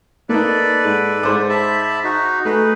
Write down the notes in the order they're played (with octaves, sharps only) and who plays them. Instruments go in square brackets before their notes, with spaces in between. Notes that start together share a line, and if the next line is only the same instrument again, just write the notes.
[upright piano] A#3 D#4 [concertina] A4 B4 D5
[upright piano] G#2
G#2 C5 D6
[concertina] E5 A5 B5
D#4 F#4
[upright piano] A3 [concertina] D#4 G#4 B4